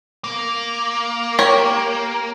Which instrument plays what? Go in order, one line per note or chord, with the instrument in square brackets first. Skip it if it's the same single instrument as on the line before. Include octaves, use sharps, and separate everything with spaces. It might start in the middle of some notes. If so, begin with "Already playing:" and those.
[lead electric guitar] A#3
[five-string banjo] G4 A#4 C#5